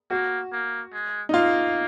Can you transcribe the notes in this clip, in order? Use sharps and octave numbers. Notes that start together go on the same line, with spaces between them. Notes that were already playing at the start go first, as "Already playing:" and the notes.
A#3 F#4
A#3
G#3
D#4
A#3 F4